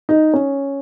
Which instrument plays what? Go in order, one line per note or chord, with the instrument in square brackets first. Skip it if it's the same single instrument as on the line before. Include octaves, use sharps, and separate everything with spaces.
[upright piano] D#4
C#4